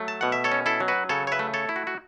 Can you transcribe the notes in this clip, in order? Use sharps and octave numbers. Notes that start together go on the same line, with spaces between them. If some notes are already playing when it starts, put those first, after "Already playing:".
Already playing: F#3 A3
A5
B2 F#5
E5
A4 C#5
C#4
E4 A4
F#3
F#4 B4
C#3 A4 C#5
C#5
B4 E5
A3
A4 C#5
E4
F#4
F#4